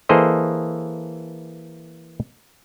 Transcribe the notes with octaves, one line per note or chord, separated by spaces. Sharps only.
E3 A#3 G#4 A4 C5 D#5